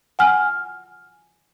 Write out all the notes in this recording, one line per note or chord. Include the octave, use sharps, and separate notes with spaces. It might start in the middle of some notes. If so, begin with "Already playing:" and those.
F#5 G#5 F6